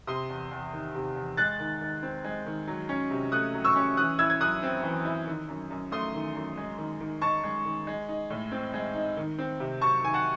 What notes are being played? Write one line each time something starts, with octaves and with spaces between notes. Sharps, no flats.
C3 C6 D#6
E2
E2
D#3
C3
E2
G#3 F#6 A6
D#3
D#3
C4
G#3
D#3
F#3
C#4
C3
A3 D#6 F#6
F#3
C#6 E6
C#4
E3 D#6 F#6
E4 E6 G#6
G#6
F#2 D#6 F#6
C4
E3
E4
D#3
F#2
F#2
A3 C6 D#6
D#3
F#2
G#3
D#3
D#3
D#4 A5 C#6
G#3
D#3
G#3
D#4
A2
C4
G#3
D#4
D#3
C4
C3
F#3 A5 C#6
D#3 G#5
F#5 A5